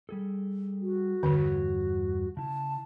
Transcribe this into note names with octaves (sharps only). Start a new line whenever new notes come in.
G3 G#4 A4
F#4
E2 G2 D3 C#5
C#3 E4 A5